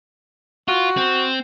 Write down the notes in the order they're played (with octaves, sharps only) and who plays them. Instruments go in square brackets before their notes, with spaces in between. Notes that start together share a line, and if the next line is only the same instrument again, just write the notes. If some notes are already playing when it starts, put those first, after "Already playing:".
[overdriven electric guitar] F4 [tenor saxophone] F#4
[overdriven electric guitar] C4